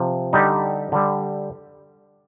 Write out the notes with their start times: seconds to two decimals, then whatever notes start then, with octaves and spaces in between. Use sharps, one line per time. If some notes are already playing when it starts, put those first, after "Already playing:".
Already playing: C3 F3
0.33 D3 G3 D#4 G4
0.92 D3 G3